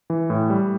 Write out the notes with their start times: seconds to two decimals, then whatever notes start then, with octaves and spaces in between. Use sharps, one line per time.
0.10 E3
0.30 A2
0.50 G3